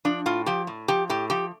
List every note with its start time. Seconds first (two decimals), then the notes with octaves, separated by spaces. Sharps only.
0.05 F3 D4
0.26 A2 F4
0.46 F3 G4
0.67 A2
0.88 F3 G4
1.10 A2 G4
1.30 F3 G4